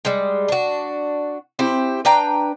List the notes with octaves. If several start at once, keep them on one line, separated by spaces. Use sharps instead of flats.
G3 G#3
D4 F#4
C4 E4 G4
D4 B4 G5 A#5